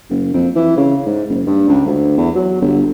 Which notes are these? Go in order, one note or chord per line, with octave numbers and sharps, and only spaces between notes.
F#1
F2
E3
C#3
G#2
F#1
G2
C#2
D2
E2
F#3
G1